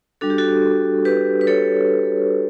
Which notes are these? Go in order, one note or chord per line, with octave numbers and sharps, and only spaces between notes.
G3 D4 F#4 A4
G4
F#4 A4
G4 B4
B4
A4 C#5